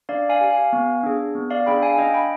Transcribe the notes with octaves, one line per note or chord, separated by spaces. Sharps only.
D4 D5 F5
F5 G#5
G4
F5 G#5
B3
D4 G#4
B3
D5 F5
D4 G#4 G5 B5
F5 G#5
D4 D#5 G5
G5 B5